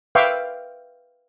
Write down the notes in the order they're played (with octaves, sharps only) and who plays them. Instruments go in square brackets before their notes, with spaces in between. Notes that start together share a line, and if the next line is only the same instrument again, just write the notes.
[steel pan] B4 E5 F5 G5 C#6 D6